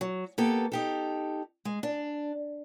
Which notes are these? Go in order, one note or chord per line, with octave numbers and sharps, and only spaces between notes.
F#3
A#3 B3 G4 A4
D#4 G4 A4
G#3
D4